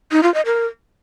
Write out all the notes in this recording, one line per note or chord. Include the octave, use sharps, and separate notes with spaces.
D#4
F4
D#5
A#4